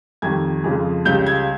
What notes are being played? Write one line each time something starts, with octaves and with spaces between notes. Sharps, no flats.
F2 D#3 G3 G#6
F2 C#3 F3 G#3
C#2 C#3 G3 G6
G#6